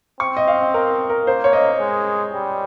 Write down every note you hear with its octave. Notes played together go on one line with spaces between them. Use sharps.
C4 C#6
D#5
F5
A#4
A#4
A#3 C5
C#5
D#5
G#3
G3